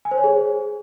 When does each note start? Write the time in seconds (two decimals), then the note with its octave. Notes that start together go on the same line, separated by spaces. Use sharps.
0.05 G#5
0.11 C5
0.18 C#5
0.24 G#4